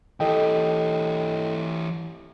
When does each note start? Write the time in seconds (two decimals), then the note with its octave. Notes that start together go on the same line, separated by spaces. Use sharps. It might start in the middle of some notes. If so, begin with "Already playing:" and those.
0.20 E3 G4 A4 D#5 G5